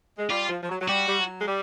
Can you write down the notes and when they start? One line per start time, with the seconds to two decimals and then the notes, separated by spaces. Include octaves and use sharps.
0.18 G#3
0.30 G3 F4
0.49 F3
0.63 F3
0.69 F#3
0.81 F#3
0.88 G3 F#4
1.08 G3
1.18 F#3
1.40 G#3
1.47 G3